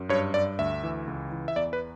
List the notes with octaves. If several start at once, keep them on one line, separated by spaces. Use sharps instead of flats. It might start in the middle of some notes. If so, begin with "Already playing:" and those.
Already playing: F#2
G2 C#5
G2 D5
D2 E5
E3
C#2
E3
E5
E2 D5
B4